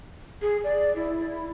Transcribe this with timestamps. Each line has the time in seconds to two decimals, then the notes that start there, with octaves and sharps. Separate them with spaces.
0.42 G#4
0.64 D5
0.96 E4